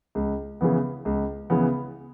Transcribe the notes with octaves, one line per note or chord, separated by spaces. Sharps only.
C#2
C#3 E3 B3
C#2
C#3 E3 B3